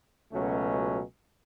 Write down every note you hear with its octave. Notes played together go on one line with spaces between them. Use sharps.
C#2 B2 F#3 A3 C#4